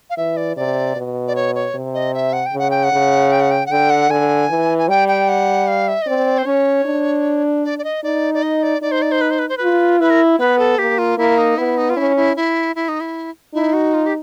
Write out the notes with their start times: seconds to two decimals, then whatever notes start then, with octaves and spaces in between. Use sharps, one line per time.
0.10 F5
0.17 E3 E5
0.37 D5
0.57 C3 D5
0.96 B2
1.28 D5
1.36 C#5
1.55 C#5
1.75 C3
1.94 D#5
2.14 E5
2.33 F#5
2.46 G5
2.53 C#3
2.59 F#5
2.71 G5
2.84 F#5
2.92 C#3
3.32 G5
3.41 F#5
3.51 G5
3.66 F#5
3.71 D3 G5
3.90 F#5
4.10 D3 G#5
4.50 E3
4.78 G#5
4.89 G3 G5
5.08 G5
5.29 F#5
5.67 F5
5.88 E5
6.02 D#5
6.07 C4 D5
6.38 C5
6.46 C#4 C#5
6.85 D4
7.65 D5
7.79 D5
7.84 D#5
8.03 D#4 D5
8.34 D5
8.43 D#5
8.63 D5
8.82 D#4 D5
8.92 C5
9.02 D5
9.12 C5
9.21 B4
9.31 C5
9.39 B4
9.49 C5
9.58 F4 B4
10.00 E4 B4
10.10 A#4
10.39 B3 B4
10.59 A4
10.79 A#3 G4
10.98 F4
11.18 A#3 E4
11.38 D#4
11.58 B3 E4
11.77 D#4
11.90 F4
11.97 C#4 E4
12.16 E4
12.36 E4
12.76 E4
12.88 D#4
13.01 E4
13.54 D#4 E4
13.73 F#4
13.94 F4
14.06 G4